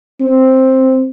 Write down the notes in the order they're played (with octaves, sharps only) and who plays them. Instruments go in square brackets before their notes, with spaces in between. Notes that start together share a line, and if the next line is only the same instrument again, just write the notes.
[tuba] C4